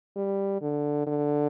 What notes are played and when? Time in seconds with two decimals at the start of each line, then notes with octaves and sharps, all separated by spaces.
0.16 G3
0.61 D3
1.07 D3